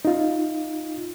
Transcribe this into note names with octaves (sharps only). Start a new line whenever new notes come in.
D#4 F4